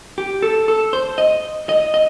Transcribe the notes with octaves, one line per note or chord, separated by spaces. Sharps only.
G4
A4
A4
C5
D#5
D#5
D#5